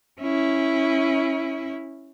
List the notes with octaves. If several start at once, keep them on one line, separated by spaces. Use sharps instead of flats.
C#4 E4